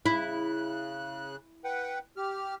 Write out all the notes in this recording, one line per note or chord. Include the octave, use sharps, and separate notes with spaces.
C#3 E4 F#6
B4 F#5 G5
G4 F6